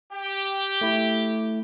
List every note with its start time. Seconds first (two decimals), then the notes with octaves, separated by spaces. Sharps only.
0.12 G4
0.81 A3 E4